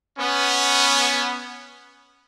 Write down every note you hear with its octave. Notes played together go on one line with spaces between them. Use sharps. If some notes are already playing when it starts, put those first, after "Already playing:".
B3 C#4